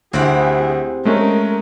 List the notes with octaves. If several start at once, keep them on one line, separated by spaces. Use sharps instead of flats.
D2 C4 E4 G4 G#4 F#5
G#3 A3 C#4 A#4